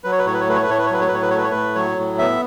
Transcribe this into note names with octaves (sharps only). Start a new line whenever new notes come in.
F#3 B4
C#5
B4
A2 C#5
B4
C#5
A3 B4
C#5
B4
A2 C#5
B4
C#5
F#3 B4
C#5
B4
A2 C#5
B4
C#5
A3 B4
C#5
A2 B4
F#3 C#5
A2
B3 E5